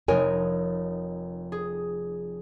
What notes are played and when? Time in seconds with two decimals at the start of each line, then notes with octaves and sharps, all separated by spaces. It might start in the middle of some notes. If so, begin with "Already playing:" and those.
0.08 F1 D#4 A#4 C#5 G#5
1.52 G#4